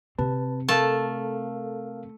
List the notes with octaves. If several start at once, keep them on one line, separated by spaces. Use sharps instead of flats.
C3 C4 B4 A5
A3 A4 A#4 F5 A5